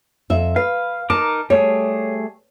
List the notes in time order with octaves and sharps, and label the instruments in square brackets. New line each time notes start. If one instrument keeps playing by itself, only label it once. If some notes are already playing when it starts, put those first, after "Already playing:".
[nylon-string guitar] F2 E5
[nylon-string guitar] B4 [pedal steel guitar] F5
[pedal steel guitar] D#4 A#4 D6 [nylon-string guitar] A5
[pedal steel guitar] G3 A3 G#4 [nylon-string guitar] C#5